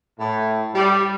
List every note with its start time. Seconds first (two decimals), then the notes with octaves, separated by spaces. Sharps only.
0.19 A2
0.74 G3